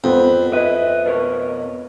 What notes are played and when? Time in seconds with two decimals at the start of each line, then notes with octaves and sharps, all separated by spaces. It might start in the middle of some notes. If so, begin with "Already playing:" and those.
0.04 F2 B3 C4
0.53 B4 D#5 E5
1.06 B2 A#4 C#5